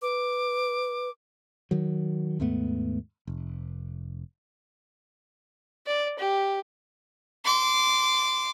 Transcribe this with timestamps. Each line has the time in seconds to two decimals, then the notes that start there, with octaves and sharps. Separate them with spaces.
0.02 B4 D6
1.71 D#3 F#3
2.40 D#2 G#2 A3 B3
3.27 F1
5.86 D5
6.19 G4
7.45 C6 D6